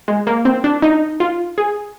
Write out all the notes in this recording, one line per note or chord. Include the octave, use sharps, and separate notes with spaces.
G#3
A#3
C4
D4
D#4
F4
G#4